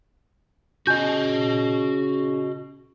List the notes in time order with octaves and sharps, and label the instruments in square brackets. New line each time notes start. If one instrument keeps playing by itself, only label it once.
[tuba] C#3 [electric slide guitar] F#4 D#5 [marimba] G#5 G6